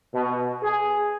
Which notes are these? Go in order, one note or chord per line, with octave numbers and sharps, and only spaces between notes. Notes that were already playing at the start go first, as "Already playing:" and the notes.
B2
G#4